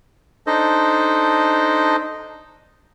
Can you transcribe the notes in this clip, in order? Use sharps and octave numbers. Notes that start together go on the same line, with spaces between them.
D4 D#4 A4 C5 D#5